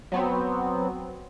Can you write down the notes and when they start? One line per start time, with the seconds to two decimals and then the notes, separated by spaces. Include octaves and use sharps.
0.12 F#3 B3 C4